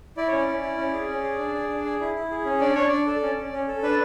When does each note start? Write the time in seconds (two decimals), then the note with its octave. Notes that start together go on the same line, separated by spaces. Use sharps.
0.17 E4 D5
0.28 C#4 C#5
0.38 D5
0.47 C#4
0.62 E4
0.77 C#4
0.93 G#4
1.09 C#4
1.24 G#4
1.39 D4
1.54 G#4
1.69 D4
1.85 G#4
2.00 E4
2.15 E4
2.31 G#4
2.45 C#4
2.60 D4 D5
2.75 D4 C#5
2.88 D4 D5
3.07 A4
3.22 C#4
3.38 C#4
3.52 C#4
3.68 A4
3.83 D4 B4